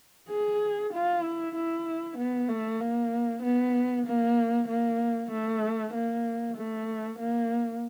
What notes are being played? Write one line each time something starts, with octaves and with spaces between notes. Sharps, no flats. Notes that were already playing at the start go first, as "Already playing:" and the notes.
G#4
F4
E4
E4
B3
A3
A#3
B3
A#3
A#3
A3
A#3
A3
A#3